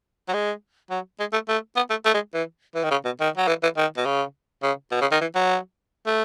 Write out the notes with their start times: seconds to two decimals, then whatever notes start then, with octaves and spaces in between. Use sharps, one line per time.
0.29 F#3
0.34 G#3
0.90 F#3
1.20 G#3
1.33 A3
1.48 A3
1.76 B3
1.90 A3
2.05 A3
2.14 G#3
2.34 E3
2.75 E3
2.84 D#3
2.91 C#3
3.05 B2
3.20 D#3
3.37 F#3
3.48 E3
3.63 E3
3.77 D#3
3.97 B2
4.05 C#3
4.63 C#3
4.91 B2
5.01 C#3
5.12 D#3
5.21 E3
5.35 F#3
6.07 A3